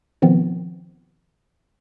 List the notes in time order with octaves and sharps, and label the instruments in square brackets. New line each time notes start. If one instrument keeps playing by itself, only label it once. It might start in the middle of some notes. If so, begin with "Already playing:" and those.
[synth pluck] B2 D#3 F3 B3 C4